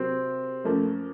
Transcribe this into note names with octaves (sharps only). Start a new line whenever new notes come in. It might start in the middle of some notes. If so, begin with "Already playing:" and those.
Already playing: C3 F#3 A#3 C4
F#2 F3 A3 A#3